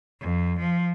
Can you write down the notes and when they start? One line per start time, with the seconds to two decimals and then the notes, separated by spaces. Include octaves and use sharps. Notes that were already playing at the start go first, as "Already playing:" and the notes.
0.21 F2
0.60 F3